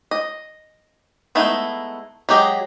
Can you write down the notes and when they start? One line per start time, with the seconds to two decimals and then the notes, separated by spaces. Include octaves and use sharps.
0.11 D#5
1.35 G#3 A3 B3 D#4 E4
2.29 F#3 G#3 G4 G#4 D#5